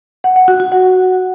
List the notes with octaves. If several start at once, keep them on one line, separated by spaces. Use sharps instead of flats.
F#5
F#5
F#4
F#4
F#5